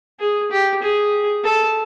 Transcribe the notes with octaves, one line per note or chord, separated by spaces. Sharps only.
G#4
G4
G#4
A4